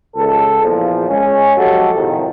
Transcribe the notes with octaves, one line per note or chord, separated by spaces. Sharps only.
C#2 A4
A#1 E2 A#2 F3
G#3 C#4
F3 F#3 G#3 F#4 G4 A4
G#1 A2 C3 D#3 F3